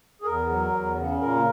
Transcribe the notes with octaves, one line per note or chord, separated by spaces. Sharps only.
G#4
E2 A#4
F#3
E2
C#3
A#2 A#4